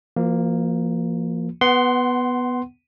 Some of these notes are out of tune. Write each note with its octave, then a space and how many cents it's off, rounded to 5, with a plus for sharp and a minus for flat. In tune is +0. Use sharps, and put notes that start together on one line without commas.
F3 -30 A#3 +0 F4 +45
B3 +0 F#5 +25 C6 +0